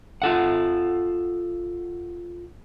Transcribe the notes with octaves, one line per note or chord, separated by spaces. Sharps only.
F4 A4 F#5